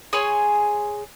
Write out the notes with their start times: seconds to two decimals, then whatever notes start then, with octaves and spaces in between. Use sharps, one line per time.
0.13 G#4 C#5 G#5 C6